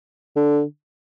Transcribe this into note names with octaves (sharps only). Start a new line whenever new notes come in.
D3